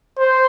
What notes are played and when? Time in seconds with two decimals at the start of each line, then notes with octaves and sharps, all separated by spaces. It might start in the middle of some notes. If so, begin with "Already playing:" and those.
0.18 C5